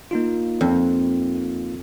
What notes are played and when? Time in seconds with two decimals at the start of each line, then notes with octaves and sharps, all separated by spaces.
0.11 A#3 D#4 F4
0.61 F2